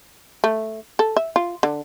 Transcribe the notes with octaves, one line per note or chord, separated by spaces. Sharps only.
A3
A4
E5
F4
D3